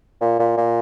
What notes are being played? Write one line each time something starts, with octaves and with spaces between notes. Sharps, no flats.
A#2
A#2
A#2